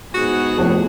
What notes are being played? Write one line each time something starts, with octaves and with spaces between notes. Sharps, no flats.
G#2 B3 F#4 G#4
F1 F2 A2